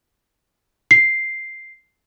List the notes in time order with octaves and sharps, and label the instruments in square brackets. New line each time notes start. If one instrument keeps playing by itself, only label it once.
[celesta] C7